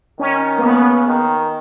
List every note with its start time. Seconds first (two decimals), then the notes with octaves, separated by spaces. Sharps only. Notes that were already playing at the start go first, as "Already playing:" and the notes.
0.19 D#3 C#4
0.58 A#3
0.63 C#3 B3
1.08 D#3